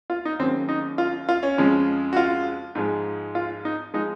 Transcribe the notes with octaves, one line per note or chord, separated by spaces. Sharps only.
F4
D#4
D#2 C#3 F#3 C4
D#4
F4
F4
C#4
F2 C#3 F3 G#3
F#4
F4
G#2 F3 G#3
F4
D#4
F3 G#3 D#4